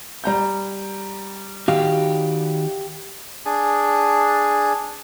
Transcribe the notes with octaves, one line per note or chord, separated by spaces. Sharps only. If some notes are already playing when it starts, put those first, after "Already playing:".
G3 A#5 G6
D#3 F#4 G4 F5
D4 G#4